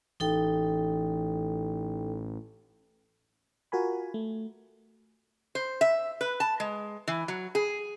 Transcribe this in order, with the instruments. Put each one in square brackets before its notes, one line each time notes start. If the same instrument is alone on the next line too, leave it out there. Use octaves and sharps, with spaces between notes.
[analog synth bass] A1 [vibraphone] D#4 A4 G5
[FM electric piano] F4 F#4 A#4 G#5 B5
A3
[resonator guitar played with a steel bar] C5
E5
B4
A5
G#3
E3
F#3
G#4